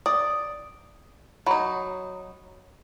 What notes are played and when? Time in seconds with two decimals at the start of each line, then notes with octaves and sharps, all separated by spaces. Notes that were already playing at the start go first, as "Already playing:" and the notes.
0.06 D5 D#6
1.46 F#3 D#4 B5